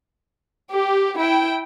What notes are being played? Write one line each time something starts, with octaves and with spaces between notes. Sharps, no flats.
G4
E4 G5